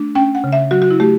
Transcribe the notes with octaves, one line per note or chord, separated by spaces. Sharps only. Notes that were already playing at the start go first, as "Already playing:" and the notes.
Already playing: A3 D4
C#4 G5
F#5
C#3
E5
F#3 F#4
F#4
E4
A3 G4